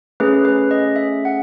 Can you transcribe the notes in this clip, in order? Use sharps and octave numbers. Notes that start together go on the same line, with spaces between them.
A3 C#4 G#4 B4
B4
D#5
E5
F#5